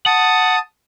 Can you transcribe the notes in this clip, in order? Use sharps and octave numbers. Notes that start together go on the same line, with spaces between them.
F#5 A5 D#6